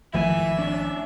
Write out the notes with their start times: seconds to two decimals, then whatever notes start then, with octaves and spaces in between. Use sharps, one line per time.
0.14 G#1 F3 A3 E4 E5 G#5
0.58 C#4 D4